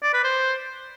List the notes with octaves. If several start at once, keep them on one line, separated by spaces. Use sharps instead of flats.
D5
B4
C5